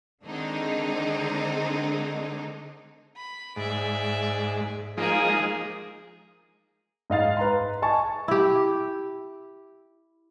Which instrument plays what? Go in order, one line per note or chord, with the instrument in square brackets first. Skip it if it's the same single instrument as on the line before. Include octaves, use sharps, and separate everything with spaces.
[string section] D3 D#3 G#3 C4 D4 D#4
[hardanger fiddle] B5
[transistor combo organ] G#2 [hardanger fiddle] D5 E5
[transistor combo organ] F3 G#3 D#4 [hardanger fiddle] A#3 G#4
[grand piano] G#2 D#5 F5 A6
B4 A#5 C6
D#5 G#5 A5 C#6
[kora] E4 G4